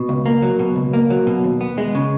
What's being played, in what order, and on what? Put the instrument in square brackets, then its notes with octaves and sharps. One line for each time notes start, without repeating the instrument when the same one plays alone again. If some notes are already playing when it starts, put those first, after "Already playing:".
Already playing: [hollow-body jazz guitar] B2
C#2
A#3
F#3
B2
C#2
A#3
F#3
B2
D#2
B3
G#3
C#3